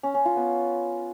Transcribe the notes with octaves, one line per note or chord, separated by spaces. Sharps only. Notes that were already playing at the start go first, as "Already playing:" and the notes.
C#4
C#4
F4
B3